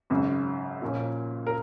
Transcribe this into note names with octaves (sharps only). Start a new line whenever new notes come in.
G#1 F#2 C#3
A#2 F3 A#3 C#4
A#4